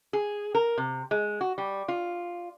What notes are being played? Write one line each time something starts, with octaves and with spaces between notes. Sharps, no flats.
G#4
A#4
C3
G#3
F#4
G3
F4